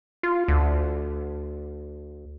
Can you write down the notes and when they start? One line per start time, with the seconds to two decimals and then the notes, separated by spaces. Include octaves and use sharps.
0.23 F4
0.48 D2